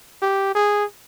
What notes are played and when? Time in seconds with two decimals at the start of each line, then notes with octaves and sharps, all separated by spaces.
0.22 G4
0.55 G#4